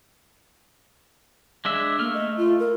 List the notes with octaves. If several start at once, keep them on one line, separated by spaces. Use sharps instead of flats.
G#3 D4 E5
A3 A#3 F6
D#5
F4
A#4